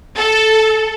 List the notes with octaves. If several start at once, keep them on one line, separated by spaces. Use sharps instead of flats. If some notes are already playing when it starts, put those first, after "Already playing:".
A4